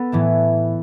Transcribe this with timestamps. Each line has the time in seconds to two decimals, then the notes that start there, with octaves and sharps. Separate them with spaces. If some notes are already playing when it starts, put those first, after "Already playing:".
Already playing: B3 A4 B4
0.12 A2 E3 A3